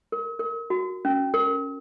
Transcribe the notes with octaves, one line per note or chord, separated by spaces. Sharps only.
A#4
A#4
F#4
C#4
A#4